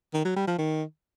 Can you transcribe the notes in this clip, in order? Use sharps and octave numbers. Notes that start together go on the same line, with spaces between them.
D#3
F#3
G3
F3
D#3